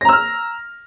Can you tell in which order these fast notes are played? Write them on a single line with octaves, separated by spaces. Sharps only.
A#6 A#5 E6 F6